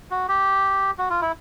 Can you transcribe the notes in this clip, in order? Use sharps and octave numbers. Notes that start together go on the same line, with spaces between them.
F#4
G4
F#4
F4
E4